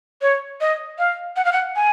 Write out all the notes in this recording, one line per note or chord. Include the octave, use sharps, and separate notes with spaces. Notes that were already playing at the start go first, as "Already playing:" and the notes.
C#5
D#5
F5
F#5
F5
F#5
G#5